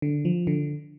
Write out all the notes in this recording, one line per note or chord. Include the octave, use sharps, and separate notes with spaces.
D3
F3
D3